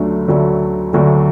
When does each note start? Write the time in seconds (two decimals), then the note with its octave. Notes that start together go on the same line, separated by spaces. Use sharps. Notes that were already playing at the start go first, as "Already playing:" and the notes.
Already playing: D2 D3 F#3 A3
0.28 D2 D3 F#3 A3
0.93 D2 D3 F#3 A3